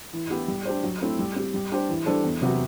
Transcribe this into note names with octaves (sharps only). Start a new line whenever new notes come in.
E3
B3 E4 G4
G3
D4 G4 C5
F#3
A3 C4 E4
G3
C4 G4
G3
D4 G4 C5
E3
G3 D4 A4 C5
E2
C3 F#3 B3 F#4